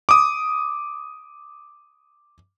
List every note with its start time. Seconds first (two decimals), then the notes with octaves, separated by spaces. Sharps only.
0.09 D6 D#6